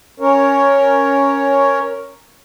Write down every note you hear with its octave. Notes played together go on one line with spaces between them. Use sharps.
C#4 A#4 C#5